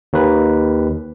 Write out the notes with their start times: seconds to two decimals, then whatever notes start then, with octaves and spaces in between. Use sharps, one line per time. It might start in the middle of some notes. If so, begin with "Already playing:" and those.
0.13 D#2 D#3 B4